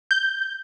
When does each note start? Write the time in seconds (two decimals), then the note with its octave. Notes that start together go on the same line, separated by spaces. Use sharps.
0.11 G6